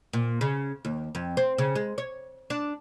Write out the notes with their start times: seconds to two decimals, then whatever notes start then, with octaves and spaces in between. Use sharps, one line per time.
0.13 A#2
0.41 C#3
0.85 D#2
1.15 F2
1.37 C4
1.58 C#3
1.76 G#3
1.98 C#5
2.50 D4